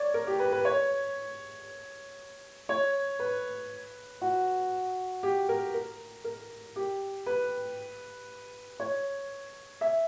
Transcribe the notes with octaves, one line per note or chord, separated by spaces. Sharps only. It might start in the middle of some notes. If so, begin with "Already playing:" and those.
Already playing: C#5 D5
A#4
G4
B4
B4
C#5
C#5
B4
F#4
G4
A#4
A#4
A#4
G4
B4
C#5
E5